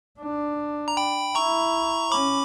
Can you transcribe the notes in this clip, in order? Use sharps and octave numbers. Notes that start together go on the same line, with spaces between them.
D4
A#5
G5 B5
E4 A#5 C#6
C#4 B5 D6